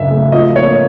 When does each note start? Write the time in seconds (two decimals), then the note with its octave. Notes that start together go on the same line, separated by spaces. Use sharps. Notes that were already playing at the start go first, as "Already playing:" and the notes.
Already playing: F#2 C#3 F#3 E5
0.10 A3
0.32 F3 D#5
0.56 A#3 C#5